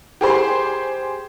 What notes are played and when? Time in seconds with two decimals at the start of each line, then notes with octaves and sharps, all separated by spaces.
0.21 G4 G#4 C5 C6